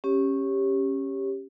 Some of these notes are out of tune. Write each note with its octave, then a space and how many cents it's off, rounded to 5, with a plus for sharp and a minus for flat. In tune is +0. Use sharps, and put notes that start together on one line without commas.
C#4 -15 G4 +5 C#5 +0